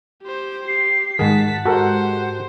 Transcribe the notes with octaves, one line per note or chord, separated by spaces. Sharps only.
G4 C5
G4 C7
G#2 D#3 G#4 F#5 A5 B6
G#2 F#4 G4 A4 A#4 C5